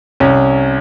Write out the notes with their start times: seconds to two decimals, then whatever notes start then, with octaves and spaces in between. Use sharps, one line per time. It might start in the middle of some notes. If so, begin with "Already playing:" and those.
0.20 C2 C#4